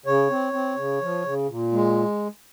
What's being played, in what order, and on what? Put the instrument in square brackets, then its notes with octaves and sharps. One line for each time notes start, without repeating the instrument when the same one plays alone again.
[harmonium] C#3 C#5
C4
C4
C#3
F3
C#3
A#2
G#3